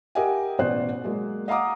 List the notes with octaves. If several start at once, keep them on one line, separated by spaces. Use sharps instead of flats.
G4 A#4 D#5 E5 F#5 G#5
A1 B2 F#4 C5 D5 F#6
F#3 G#3 A#3
D#5 F5 F#5 A#5 D6 D#6